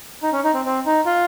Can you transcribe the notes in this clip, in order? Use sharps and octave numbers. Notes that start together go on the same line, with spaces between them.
D#4
C#4
D#4
C4
C4
D#4
F4